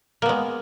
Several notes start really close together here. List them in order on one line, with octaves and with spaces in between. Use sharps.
A#3 B3 G#3